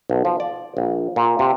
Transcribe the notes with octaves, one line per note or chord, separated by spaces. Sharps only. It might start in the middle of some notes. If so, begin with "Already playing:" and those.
B1
F3
D5
A#1
A#2
C3